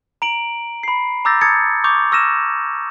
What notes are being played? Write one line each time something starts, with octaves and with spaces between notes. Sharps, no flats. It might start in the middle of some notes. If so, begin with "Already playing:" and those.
A#5 D7 F#7
B5 C7
A#5 D6 E6 G6 A6 A#6
A5 D#6 G#6 A6 C#7
C#6 D6 G6 F7
C#6 E6 F6 A#6 D#7 E7